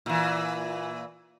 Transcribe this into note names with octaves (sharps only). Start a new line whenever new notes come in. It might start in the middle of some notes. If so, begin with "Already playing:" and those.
A#2 E3